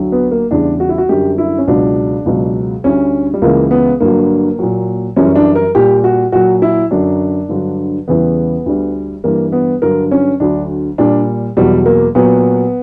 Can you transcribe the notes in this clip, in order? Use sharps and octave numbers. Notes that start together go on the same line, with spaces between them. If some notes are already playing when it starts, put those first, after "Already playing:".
Already playing: D2 D3 F#3
B3
A#3
E2 C#3 G3 D4
F#4
E4
F#4
F#2 D3 G3 G4
E4
C#4
C#2 B2 F#3 D4
C#2 B2 F#3
D2 D3 G3 C#4
G3
C#2 C#3 E3 A#3
B3
G2 D3 F#3 A#3
A#2 F#3
F#2 E3 G3 C#4
D4
A#4
A#2 G3 G4
F#4
A#2 F#3 F#4
E4
F#2 D3 F#3 D4
G2 D3 F#3
E2 C#3 E3 G3 B3
D2 D3 G3
G2 E3 G3 A#3
B3
G2 D3 F#3 A#4
C#4
D2 D3 F#3 D4
A#2 G3 D4
E2 B2 F#3 G3
A#3
A#2 F#3 B3